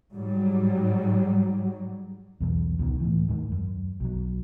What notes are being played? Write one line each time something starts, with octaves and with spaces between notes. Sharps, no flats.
G#2 F#3 G3
B1 E2
C#2 B2 D#3
A2 E3
D#2 G#2 D#3
F#2
B1 F#3